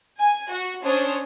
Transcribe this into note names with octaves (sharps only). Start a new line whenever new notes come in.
G#5
F#4
C#4 D4 C5 C#5 D#6